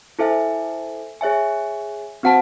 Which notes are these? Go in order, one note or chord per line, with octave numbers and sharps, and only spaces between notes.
E4 A4 C5 E5 G#5
G#4 C#5 E5 G#5
C4 F#4 C5 F#5 A5